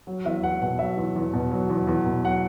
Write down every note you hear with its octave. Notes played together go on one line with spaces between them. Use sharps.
F#3
E2 E5
E2 F#5
B2 F#5
F#3 E5
E2
E2
B2
F#3
E2
E2
B2
F#3 F#5